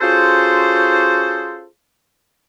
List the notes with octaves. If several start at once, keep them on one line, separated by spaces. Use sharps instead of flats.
C#4 F4 F#4 G#4 A4 C5